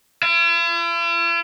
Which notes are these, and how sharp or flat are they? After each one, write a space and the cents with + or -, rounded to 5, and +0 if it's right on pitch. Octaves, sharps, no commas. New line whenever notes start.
E4 +45